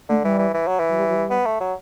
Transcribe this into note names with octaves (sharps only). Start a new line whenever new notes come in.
D3 A3
E3 G3
E3
E3
F#3
E3
F#3
G3
F#3
G3
B3
A3
F#3